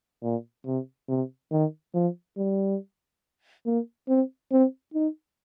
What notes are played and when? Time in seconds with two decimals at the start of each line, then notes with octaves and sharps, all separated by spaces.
0.23 A#2
0.66 C3
1.09 C3
1.52 D#3
1.94 F3
2.37 G3
3.66 A#3
4.09 C4
4.51 C4
4.94 D#4